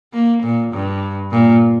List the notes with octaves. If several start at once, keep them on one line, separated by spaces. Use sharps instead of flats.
A#3
A#2
G2
A#2